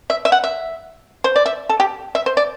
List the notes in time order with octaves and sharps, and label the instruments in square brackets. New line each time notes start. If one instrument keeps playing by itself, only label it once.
[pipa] E5
E5
F#5
E5
C5
D5
E5
A4
G4
E5
C5
D5